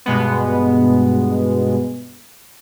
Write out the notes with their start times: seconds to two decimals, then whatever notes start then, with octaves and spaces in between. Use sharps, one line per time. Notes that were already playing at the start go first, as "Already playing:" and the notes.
0.06 G2 B2 G#3 B3